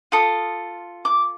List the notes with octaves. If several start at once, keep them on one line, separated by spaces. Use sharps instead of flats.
F4 A4 D#6
D6